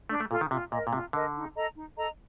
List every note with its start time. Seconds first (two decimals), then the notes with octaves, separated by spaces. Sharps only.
0.09 A3 D4
0.20 A3
0.30 A#2 F4 A4
0.41 D#3
0.51 C3 F4
0.72 A#2 A#4 D#5
0.87 A#2
0.93 C3 F4
1.13 D3 A#4 D#5
1.35 D#4
1.56 A4 D#5 A#5
1.76 D#4
1.97 A4 D#5 A#5